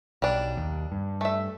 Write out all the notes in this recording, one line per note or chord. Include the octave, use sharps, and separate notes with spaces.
B1 G3 D4
D#2
G2
A3 E5